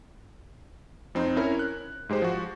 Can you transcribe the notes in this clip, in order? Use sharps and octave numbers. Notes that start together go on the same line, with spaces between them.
F2 C4 D#4
C#4 E4 A#4 C#5
F#6
G#2 G#3 G4 C5
F3 F#4